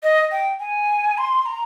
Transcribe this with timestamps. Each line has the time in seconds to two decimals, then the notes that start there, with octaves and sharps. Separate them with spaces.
0.03 D#5
0.32 G5
0.60 G#5
1.18 C6
1.46 A#5